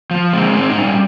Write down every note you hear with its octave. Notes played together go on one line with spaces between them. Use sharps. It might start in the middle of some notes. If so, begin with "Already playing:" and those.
F3
G#3 C4
G#2 C4
D#4
G3 C#4